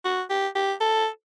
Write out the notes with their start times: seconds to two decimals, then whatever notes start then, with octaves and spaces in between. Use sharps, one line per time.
0.05 F#4
0.30 G4
0.55 G4
0.80 A4